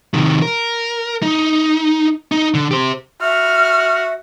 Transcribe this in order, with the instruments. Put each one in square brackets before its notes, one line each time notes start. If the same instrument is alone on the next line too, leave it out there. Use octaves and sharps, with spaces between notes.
[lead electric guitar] C3 D#3
A#4
D#4
D#4
D3
G4 C5
[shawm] F#4 [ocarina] E5 [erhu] F6